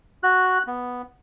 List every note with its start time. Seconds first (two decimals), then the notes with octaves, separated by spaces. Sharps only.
0.23 F#4 F#6
0.67 B3